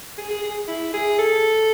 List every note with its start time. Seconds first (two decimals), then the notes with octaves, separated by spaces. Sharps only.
0.18 G#4
0.30 G#4
0.43 G#4
0.68 E4
0.93 G#4
1.18 A4